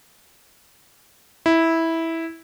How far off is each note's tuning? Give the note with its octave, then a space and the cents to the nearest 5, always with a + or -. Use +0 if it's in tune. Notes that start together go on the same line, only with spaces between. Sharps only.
E4 -10